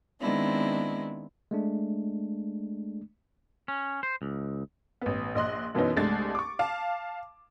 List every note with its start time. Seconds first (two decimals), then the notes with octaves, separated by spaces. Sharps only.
0.21 D#3 G#3 B3 C4 D4 E4
1.51 G#3 A3 D4
3.68 C#4
4.03 C5
4.22 C#2
5.01 A1 B3
5.35 A#1 D#5 C6 F#6
5.75 F#2 B2 E3 B3 C#4 D#4
5.96 C2 G#3 A3 D4 A6
6.35 C#6 D6
6.59 F5 A5